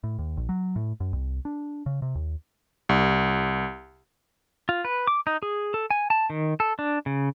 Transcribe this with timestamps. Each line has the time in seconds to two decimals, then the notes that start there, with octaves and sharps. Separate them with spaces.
0.04 A2
0.19 D#2
0.37 A#1
0.49 F#3
0.76 A2
1.00 F#2
1.13 C2
1.45 D4
1.86 C#3
2.02 C3
2.15 D#2
2.89 C2
4.69 F4
4.85 B4
5.07 D6
5.27 D#4
5.43 G#4
5.74 A4
5.91 G#5
6.10 A5
6.30 D#3
6.60 A4
6.79 D4
7.06 C#3